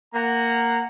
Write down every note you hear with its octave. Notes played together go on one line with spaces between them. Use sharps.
A#3 F#5 A#5